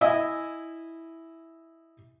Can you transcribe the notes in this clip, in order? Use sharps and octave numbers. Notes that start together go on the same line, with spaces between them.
E4 D#5 E5 G#5